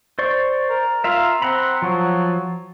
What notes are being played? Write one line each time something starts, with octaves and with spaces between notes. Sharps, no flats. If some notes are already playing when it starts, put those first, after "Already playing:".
C5 D5 C#6
A#4
F4 E5 F5 A#5
C4 F#5 A#5 B5
F3 F#3